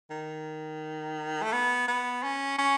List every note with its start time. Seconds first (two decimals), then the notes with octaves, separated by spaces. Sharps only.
0.10 D#3
1.42 A3
1.52 B3
1.88 B3
2.23 C#4
2.59 C#4